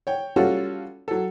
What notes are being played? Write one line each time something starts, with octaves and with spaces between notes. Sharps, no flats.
C#5 G5
G3 C#4 F4 F#4 A4
F#3 A4